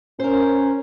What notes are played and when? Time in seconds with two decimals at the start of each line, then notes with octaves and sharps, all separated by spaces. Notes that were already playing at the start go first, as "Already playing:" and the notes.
0.20 C#4 A#4 C5